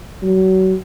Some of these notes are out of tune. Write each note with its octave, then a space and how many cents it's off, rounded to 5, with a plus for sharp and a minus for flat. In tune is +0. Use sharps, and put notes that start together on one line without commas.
F#3 +30